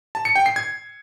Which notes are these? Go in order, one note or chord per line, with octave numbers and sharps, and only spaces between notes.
A5
C#7
G5
C7
G#6